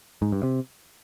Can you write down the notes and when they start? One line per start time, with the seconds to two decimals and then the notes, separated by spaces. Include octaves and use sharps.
0.22 G#2
0.32 G2
0.43 C3